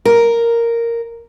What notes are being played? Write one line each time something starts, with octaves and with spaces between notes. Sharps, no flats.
A#4